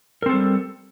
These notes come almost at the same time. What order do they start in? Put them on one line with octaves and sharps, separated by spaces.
A#4 C4 A4 G3